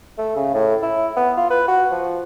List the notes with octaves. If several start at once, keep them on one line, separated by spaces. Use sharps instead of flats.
A3
C#3
A2
E4
B3
F4
B4
F#4
F3